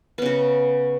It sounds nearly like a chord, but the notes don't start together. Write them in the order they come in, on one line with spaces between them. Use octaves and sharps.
B3 C#3 F#4